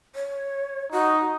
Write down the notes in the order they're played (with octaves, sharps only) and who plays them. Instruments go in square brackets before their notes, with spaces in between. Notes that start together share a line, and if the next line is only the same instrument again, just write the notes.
[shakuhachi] C#5
[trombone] D#4 [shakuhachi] F#4